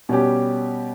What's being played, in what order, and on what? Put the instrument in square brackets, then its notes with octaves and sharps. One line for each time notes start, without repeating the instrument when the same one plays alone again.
[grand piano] B2 G3 C#4 G4